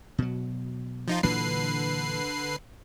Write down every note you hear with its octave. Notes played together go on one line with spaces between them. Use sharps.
B2 F#3
F3 D#4 F4
A#2 D3 E3 F#3 B4 C7